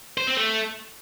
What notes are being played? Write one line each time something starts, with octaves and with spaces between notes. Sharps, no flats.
C5
C4
A3